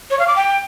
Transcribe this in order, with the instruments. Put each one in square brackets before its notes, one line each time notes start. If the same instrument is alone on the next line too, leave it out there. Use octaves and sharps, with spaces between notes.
[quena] C#5
F5
D6
G5